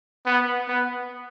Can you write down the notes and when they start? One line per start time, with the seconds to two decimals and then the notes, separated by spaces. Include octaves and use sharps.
0.26 B3
0.68 B3